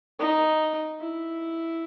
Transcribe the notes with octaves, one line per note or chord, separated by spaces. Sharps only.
D#4
E4